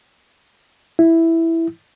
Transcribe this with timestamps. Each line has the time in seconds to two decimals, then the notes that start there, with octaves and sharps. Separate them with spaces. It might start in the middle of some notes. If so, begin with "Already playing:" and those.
0.99 E4